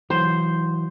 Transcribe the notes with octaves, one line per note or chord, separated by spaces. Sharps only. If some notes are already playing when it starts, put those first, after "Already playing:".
E3 F#3 C5